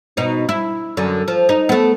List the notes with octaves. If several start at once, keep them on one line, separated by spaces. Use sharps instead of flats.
B2 D#4
E4
F#2 D3
F3
D#4
A3 B3